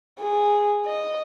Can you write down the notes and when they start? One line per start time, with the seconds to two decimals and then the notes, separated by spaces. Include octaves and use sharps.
0.20 G#4
0.86 D#5